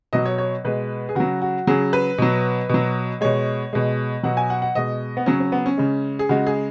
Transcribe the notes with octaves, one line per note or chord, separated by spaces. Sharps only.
B2 F#3 D#5
C#5
C#5
B2 G#3 B4
G#4
C#3 F#3 F#4
F#4
C#3 F#3 G#4
B4
B2 F#3
B2 F#3
B2 G#3 C#5
B2 G#3
B2 F#3 F#5
G#5
F#5
F#5
B2 G#3 D#5
B3
C#3 F#3 C#4
C#4
B3
C#4
C#3 G#3
G#4
C#3 G#3 F#4
G#4